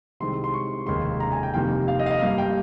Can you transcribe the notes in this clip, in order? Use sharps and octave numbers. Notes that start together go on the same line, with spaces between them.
C2 C3 D#3 G#3 C4 C6
C6
C#6
F1 D#2 C#3 G#3 C6
A#5
G#5
G5
F1 F2 D#3 G3 A#3 G5
F5
D#5
F5
D#5
G2 G3 A#3 F5
G5